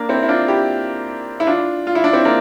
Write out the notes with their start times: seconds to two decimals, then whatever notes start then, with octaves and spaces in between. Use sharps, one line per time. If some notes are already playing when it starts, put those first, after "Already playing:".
Already playing: A#3 D4
0.09 C4 E4
0.23 E4
0.28 D4 F4
0.48 E4 G4
1.40 E4
1.47 D4 F4
1.87 F4
1.95 E4
2.04 D4
2.13 C4 E4
2.25 A#3 D4